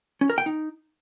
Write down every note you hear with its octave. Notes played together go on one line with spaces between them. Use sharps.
C#4
A#4
G5
D#4